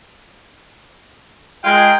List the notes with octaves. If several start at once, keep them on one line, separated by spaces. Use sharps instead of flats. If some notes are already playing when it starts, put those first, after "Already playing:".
G#3 F4 A#4 G5